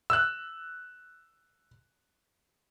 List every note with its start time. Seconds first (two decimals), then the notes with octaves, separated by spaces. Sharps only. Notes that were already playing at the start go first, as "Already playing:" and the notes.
0.10 E6 F#6